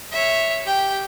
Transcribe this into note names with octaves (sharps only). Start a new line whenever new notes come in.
C#5 E5
G4 G5